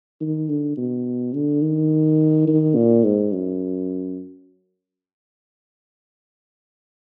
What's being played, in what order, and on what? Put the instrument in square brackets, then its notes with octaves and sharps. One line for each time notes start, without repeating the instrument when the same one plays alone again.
[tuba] D#3
D3
B2
D3
D#3
D#3
A#2
G#2
F#2